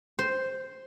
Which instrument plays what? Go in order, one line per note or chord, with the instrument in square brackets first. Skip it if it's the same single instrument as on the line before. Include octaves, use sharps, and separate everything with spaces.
[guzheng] C5